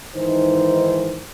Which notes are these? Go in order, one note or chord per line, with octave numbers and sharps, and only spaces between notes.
G#2 D#3 E3 D#4 C5